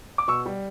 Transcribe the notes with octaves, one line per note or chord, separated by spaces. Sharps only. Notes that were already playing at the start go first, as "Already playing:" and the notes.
D6
B2 C#6 E6
G3